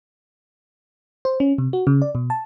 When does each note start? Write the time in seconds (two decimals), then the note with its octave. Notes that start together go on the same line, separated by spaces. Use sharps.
1.25 C5
1.40 C#4
1.58 C3
1.73 F#4
1.87 C#3
2.02 D5
2.15 B2
2.30 A5